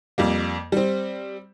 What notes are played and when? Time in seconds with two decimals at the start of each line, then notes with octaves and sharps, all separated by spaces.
0.18 F2 G3 A#3
0.72 G3 C4